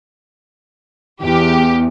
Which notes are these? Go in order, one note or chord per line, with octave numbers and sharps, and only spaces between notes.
E2 G4